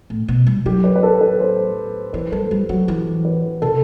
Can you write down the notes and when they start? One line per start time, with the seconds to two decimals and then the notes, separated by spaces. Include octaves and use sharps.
0.10 A2
0.28 B2
0.46 G3
0.66 F#3 G4
0.84 B4
0.96 B4
1.03 A4
1.21 B4
1.40 C5
2.13 E3 B4
2.32 G3 A4
2.51 G3 G4
2.69 F#3 F#4
2.88 E3 G4
3.25 B4
3.62 C3 A4